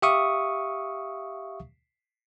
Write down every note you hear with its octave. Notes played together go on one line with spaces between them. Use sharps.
G4 E5 F5 C#6 D#6